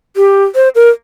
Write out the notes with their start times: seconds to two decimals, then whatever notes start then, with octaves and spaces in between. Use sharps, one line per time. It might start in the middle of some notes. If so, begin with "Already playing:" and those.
0.17 G4
0.55 C5
0.75 A#4